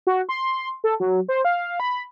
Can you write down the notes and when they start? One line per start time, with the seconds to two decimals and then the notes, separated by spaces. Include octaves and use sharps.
0.07 F#4
0.29 C6
0.84 A4
1.00 F#3
1.28 C5
1.45 F5
1.80 B5